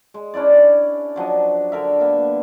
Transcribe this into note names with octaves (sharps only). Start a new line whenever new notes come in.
G#3
C#4 D4 E4 D5
F3 F#3 D4 D#5
D3 A#4 E5
A#3 B3 E5